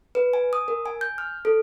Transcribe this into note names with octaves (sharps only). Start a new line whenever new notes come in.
B4
G#5
D#6
A#4
G#5
G6
F6
A4